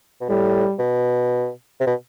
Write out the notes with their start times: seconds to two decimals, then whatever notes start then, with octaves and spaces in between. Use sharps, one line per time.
0.21 B2
0.29 A2 G3
0.79 B2
1.80 C3
1.87 B2